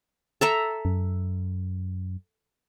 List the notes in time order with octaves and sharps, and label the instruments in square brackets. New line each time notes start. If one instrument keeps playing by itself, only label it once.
[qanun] A4 E5 A#5
[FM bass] F#2